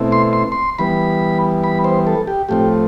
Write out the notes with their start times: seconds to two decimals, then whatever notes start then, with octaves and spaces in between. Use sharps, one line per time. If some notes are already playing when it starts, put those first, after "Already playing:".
Already playing: B2 A3 C4 E4
0.12 C6
0.33 C6
0.52 C6
0.78 E3 G3 B3 B5
1.64 B5
1.84 C5
2.07 A4
2.27 G4
2.49 A2 F3 A3 C4 G4